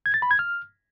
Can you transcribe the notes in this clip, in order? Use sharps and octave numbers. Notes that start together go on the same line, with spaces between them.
G#6
A6
B5
G#6
F6